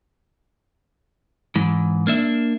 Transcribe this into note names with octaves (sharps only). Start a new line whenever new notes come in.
G#2 E3
A#3 D4 E5